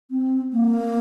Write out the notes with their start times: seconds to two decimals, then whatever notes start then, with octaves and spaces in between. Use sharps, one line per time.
0.11 C4
0.53 A#3